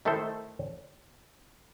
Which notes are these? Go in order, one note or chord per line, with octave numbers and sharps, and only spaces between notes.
D#3 A3 E4 A4 C5